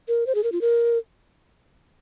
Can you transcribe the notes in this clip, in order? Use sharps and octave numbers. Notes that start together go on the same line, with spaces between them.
A#4
C5
G#4
A#4
F4
A#4